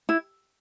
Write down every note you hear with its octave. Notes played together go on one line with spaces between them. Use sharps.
E4